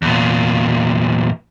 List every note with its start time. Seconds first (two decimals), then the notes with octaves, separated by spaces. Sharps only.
0.02 E2 A#2